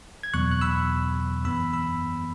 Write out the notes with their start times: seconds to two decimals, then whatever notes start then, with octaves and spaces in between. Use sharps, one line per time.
0.23 G#6
0.34 E2 B2 F#3 B3 C#6 F#6
0.51 F#6
0.61 B5 E6
1.45 F#2 E3 B3 B5 E6
1.73 B5 E6